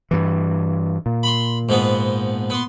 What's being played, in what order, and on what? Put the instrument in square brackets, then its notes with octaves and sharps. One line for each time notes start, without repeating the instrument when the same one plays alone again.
[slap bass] G2 E3
A#2
[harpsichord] B5 C6
G#2 F3 B3
B3 C6